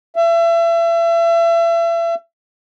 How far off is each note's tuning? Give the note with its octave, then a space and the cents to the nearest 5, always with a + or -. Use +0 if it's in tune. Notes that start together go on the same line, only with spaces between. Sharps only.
E5 +35